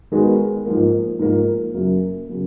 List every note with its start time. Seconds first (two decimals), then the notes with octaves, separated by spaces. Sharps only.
0.12 D#3 G#3 B3 F#4
0.65 G#2 F3 A#3
1.19 G#2 F3 A#3
1.74 F#2 C#3 F#3 A#3
2.28 C#3 F#3 A#3